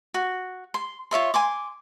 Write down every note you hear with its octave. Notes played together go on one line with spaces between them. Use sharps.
F#4
C6
F4 C#5 E5 C6
G#5 C6 D6